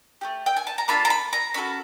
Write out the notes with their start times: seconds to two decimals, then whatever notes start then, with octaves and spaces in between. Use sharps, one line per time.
0.21 A3 D4 G4
0.46 G5
0.56 G#5
0.67 A5
0.78 A#5
0.88 A#3 D4 F4 A4 B5
1.05 A#5
1.10 B5
1.33 A#5
1.54 C#4 F#4 A4 B5